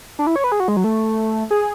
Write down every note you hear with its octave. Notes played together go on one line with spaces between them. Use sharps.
D4
E4
C#5
B4
G#4
F#4
G#3
F#3
A3
G#4